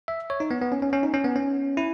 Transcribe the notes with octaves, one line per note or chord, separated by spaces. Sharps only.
E5
C#5
D#4
B3
B3
C#4
C#4
C#4
D#4
C#4
B3
C#4
E4